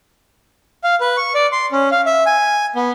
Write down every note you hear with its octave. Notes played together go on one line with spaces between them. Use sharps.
F5
B4
C#6
D5
C6
C#4
F5
E5
G#5
B3